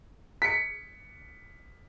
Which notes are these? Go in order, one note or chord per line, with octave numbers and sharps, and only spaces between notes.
B6 C#7